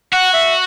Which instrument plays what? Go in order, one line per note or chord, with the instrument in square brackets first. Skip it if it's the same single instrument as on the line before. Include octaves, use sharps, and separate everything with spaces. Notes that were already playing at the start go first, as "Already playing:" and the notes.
[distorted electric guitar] F#4 [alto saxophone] F#5
[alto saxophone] E5